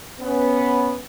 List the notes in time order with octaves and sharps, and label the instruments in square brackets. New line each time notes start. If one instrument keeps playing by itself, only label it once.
[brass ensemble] B3 C#4